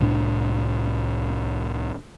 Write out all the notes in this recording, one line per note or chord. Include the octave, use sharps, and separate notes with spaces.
C2 A2 D4